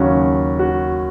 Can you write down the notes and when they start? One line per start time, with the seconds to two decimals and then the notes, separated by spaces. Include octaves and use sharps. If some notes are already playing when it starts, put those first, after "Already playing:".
Already playing: D#2 C#3 F#3 C#4 F#4
0.59 F#4